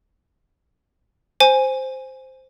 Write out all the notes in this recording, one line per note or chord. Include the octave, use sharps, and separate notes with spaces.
C5 G#5